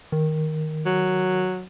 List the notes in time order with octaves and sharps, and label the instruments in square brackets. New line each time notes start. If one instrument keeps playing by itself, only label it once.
[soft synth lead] D#3
[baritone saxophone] F#3